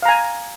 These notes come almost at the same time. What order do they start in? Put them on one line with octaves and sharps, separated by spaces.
F5 A#5 G#5